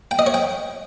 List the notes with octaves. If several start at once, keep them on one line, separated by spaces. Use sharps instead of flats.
G5
D#5
C#5
G5